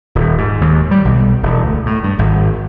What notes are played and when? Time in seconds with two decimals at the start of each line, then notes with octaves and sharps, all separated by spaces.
0.15 D#1
0.38 G#2
0.61 D#2
0.91 G3
1.05 B1
1.43 E1
1.64 D2
1.86 A2
2.03 G2
2.19 G#1